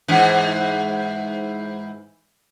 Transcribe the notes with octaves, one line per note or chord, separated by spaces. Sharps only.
G#2 E3